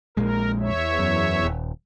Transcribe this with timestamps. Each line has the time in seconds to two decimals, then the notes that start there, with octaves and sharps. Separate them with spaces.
0.17 A#1 A#2 G#3 A#4
0.60 E2 C#5 E5
0.99 F#2
1.43 D#1